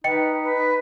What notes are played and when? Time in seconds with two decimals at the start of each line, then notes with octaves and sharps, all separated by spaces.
0.04 D#4 B4 D#5 G5 C#7
0.43 B4